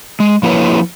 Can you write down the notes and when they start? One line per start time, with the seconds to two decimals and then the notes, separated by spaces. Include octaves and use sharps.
0.20 G#3
0.43 F3 A#3 E4 B4 C#5